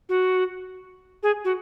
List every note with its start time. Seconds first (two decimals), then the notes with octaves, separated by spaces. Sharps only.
0.09 F#4
1.23 G#4
1.45 F#4